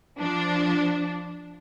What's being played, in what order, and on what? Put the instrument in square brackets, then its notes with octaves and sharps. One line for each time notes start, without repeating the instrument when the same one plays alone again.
[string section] F3 D4